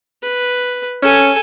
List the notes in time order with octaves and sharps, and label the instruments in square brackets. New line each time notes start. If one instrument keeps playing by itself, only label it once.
[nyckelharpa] B4
[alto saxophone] C#4 [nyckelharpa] A4 G#5